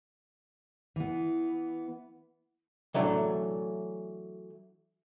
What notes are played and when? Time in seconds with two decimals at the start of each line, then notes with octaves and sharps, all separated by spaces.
0.96 E3 B3
2.94 E3 F#3 A3 D4